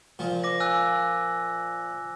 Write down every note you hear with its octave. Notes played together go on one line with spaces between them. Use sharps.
A#2 F3
D6 A#6
G#5 E6 F#6